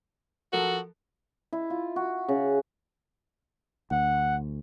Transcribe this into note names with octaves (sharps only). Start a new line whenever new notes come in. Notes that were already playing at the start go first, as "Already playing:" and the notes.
F3 F#4 A4 A#4
E4
F4
F#4
C#3
D2 F#5